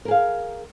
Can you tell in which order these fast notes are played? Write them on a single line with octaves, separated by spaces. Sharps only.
A#4 G#4 F5